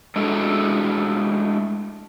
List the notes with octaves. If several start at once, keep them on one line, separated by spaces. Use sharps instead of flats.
G#3 A3 D4 E4 F#4 A4